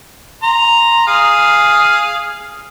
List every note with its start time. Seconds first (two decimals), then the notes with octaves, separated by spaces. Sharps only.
0.43 A#5 C6
1.07 G#4 F5